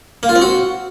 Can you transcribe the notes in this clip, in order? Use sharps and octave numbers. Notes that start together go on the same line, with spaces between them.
A#3
F4
C4
F#4